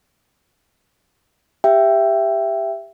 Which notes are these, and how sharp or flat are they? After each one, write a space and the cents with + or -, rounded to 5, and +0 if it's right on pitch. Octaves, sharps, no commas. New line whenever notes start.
G4 +15 E5 +15 G5 +0